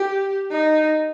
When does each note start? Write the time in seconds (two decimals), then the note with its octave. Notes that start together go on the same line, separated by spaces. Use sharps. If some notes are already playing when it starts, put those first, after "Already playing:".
Already playing: G4
0.51 D#4